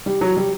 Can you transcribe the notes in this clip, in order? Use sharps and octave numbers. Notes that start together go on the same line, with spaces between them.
G3
F#3
G3